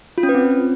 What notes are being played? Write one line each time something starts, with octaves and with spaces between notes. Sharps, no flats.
F4
C#4
B4
C4